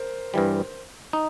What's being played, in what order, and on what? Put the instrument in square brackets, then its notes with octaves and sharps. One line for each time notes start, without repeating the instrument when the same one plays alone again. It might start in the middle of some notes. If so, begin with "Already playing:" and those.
Already playing: [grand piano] A#4 C5
[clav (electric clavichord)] G2 E3 G3
D#4